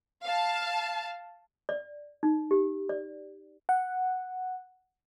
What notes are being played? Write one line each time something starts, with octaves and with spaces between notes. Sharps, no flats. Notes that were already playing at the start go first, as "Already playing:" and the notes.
F5 A5
D5
D#4
G4
D5
F#5